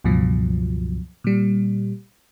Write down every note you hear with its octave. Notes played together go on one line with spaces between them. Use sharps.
C#2 G2 B2 F3 F#3
A#2 G3